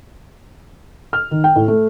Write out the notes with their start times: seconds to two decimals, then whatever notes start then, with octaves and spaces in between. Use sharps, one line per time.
1.13 F6
1.31 D#3
1.44 G5
1.55 A2
1.68 A3